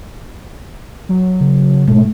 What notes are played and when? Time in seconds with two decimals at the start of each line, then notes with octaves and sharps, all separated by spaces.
1.09 F#3
1.41 C#3
1.88 G#2 B2 A3 C#4